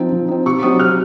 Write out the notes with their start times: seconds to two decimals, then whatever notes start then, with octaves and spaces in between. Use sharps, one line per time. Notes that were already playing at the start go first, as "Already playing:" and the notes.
Already playing: F3 C4 D#4
0.11 F3
0.28 C4 D#4
0.45 C3 C#6
0.63 F#3 C4 D#4 D#6
0.79 C3 F6